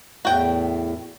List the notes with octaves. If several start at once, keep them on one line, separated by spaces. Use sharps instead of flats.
E2 A2 F#4 G5